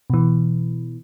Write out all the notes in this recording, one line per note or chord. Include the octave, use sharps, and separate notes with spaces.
B2 E3